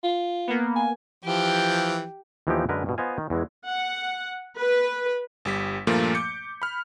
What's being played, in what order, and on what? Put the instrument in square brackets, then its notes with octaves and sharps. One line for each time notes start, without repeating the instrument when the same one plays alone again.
[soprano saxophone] F4
[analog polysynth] A#3 B3
[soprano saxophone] G#5
[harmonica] E3 F3 [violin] G4
[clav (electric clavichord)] D#2 E3 F3 B3 D#4 G4
F#2 D3 G#3 A#4 B4
G2 B2
B3 F4 C5 D#5 F5 G#5
D#3
E2 E3 G#3
[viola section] F#5
B4
[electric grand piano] G1 G3 B6
G2 A#2 F3 A3 A#3
D6 G6 C#7
B5 F6